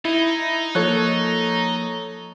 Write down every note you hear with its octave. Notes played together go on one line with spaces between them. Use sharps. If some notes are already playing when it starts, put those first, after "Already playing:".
D#4 E4
F3 A#3 A4 C#5 F#6